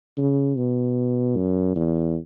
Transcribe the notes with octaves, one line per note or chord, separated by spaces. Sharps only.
C#3
B2
F#2
E2